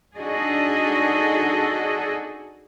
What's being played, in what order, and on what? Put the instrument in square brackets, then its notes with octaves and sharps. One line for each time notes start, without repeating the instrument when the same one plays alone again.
[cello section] D4 D#4 F#4 G#4 A4 D#5